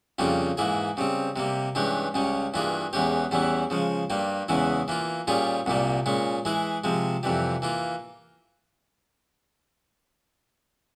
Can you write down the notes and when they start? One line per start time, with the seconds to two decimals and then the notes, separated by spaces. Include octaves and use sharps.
0.19 F2 C#3 G3 A#3 F4
0.57 G#2 E3 A#3 E4 G#4
0.97 C#3 G3 C4
1.36 C3 G3 A#3
1.75 G2 E3 G#3 C#4 G4
2.14 C#2 C#3 G3 C#4
2.54 G2 E3 A#3 F4 G#4
2.93 E2 E3 G#3 C#4 G4
3.31 E2 E3 G3 C#4 E4
3.70 C#3 F3 G#3
4.10 G2 G3 A#3
4.48 E2 C#3 E3 G#3 E4
4.88 E3 A#3 F4
5.27 A#2 G3 C#4 F4 G#4
5.66 C2 A#2 G3 A#3
6.06 A#2 G#3 C#4
6.45 E3 G#3 E4 G#4
6.84 C3 F3 G#3
7.23 F2 C3 E3 G3
7.62 E3 A#3 F4